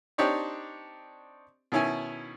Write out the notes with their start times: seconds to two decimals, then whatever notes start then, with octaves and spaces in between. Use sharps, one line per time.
0.18 C4 D4 D#4 G4 C#5 D5
1.72 B2 D#3 C#4 E4 G#5